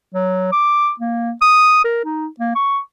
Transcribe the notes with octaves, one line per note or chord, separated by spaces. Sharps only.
F#3
D6
A#3
D#6
A#4
D#4
A#3
C#6